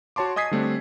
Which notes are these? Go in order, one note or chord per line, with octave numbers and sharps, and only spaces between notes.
F#4 C#5 A5 C6 D6
D#5 G#5 D#6 G#6 B6 C7
D3 G3 A3 C4 D4